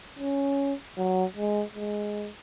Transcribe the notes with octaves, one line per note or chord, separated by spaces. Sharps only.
C#4
F#3
G#3
G#3